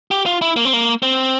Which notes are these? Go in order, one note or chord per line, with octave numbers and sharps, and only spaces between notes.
G4
F4
E4
A#3
C4
A#3
C4